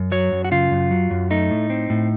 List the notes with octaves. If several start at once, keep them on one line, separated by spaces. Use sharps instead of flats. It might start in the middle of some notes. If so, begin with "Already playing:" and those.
Already playing: F#2
F#3 C#5
F#2
F#4
C#3 F4
F#2
F#3
F#2
A3 D#4
A2
C4
A2